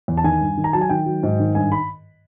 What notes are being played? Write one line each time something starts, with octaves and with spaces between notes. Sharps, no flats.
E2
A5
D#3 G#5
G2
D#3
A#5
F#3 A5
G#5
D#3 G5
F#3
G#2
D#3
G2 G#5
B5